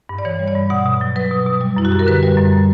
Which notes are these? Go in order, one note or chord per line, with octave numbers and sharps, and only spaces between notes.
G2
D5
E3 C#5
G3
D5
G2
B2 F#5
B2
F#3
F#3 B4
B2
B2
G3
F#2 E4
F#4
F#2 G4
A#4
D3 B4
G3
F#2
G3